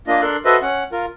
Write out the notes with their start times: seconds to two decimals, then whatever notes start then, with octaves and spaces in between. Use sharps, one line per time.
0.07 A#3 D4 F4 D#5
0.21 D4 A4 A#4 C6 F#6
0.45 F#4 A4 B4 C5 D#5 E5
0.62 C#4 F#5
0.92 F4 A#4